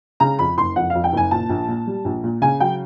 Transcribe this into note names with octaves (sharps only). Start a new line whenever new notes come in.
C#3 A#5
F2 B5
F#1 C6
F2 F#5
F2 F5
G5
F#1 G#5
A#2 A5
A#1
A#2
G3
A#1
A#2
C#3 G#5
F#3 G5